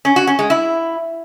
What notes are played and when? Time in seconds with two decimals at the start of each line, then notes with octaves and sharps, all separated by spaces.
0.05 C#4
0.16 F#4
0.27 C#4
0.39 G#3
0.50 E4